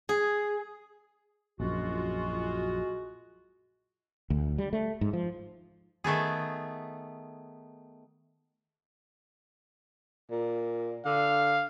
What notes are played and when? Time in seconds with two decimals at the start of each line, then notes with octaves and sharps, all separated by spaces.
0.09 G#4
1.60 A#1 F#2 G#3 F4 F#4
4.30 D2
4.58 G3
4.73 A3
5.01 G#2
5.13 F3
6.04 D#3 A3 B3 G#4
10.31 A#2
11.05 D3 F5